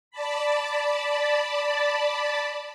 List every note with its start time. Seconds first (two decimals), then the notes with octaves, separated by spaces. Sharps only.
0.11 D5 A5 B5